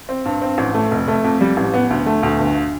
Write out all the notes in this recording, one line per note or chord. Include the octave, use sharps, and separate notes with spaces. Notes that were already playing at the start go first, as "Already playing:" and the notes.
C4
G2
C4
A1
A3
F1
A3
F2
G3
A1
B3
D2
A3
D2
G1